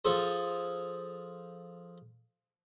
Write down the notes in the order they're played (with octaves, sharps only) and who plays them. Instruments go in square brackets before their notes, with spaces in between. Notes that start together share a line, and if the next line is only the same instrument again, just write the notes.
[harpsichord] F3 G#4 A4 C5